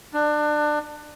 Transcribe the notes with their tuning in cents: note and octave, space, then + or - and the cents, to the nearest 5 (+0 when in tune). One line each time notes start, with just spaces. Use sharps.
D4 +25